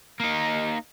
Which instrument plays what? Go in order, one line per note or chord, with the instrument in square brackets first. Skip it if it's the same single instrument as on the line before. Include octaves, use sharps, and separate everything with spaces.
[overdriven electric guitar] A#3 D#4